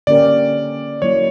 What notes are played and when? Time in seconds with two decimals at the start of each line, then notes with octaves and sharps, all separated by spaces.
0.07 D3 A#3 C#4 G4 A#4 D5
1.02 F#3 A#3 E4 C#5